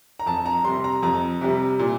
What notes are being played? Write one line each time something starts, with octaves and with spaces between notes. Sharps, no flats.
A#5
F2 A5
A#5
C3 G3 C6
A#5
F2 A#5
C3 G3
A#2